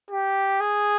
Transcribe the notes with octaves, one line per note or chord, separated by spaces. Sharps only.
G4
G#4